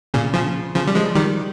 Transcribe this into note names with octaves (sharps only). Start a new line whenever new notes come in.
A#2 C#3
C#3 F3
C#3 F3
G3
F3 G#3
D#3 G3